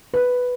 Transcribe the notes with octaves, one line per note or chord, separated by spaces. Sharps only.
B4